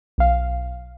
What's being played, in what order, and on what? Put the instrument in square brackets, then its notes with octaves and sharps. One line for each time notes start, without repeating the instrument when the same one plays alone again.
[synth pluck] B1 F5